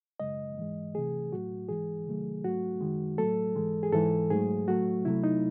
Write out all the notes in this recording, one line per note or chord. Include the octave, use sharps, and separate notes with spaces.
F#2 C#3 G#3 D#5
G#2 E3 G#3
C3 E3 A3 G#4
A2 F#3 A3 F#4
G#2 E3 G#3 G#4
C3 D#3 F#3 A3
G#2 F#3 A3 F#4
F#2 D#3 G#3
A2 F#3 A3 A4
G#2 E3 G#3
G#4
G#2 E3 G#3 A4
G#2 F#3 A3 G#4
A2 F#3 A3 F#4
C3 F#3 A3 E4
D#4